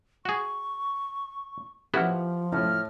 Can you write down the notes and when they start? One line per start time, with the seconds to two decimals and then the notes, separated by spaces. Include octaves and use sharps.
0.25 F#4 G#4 C#6
1.94 F3 B3 E4 F#4 G4 F#5 F6
2.52 A2 F6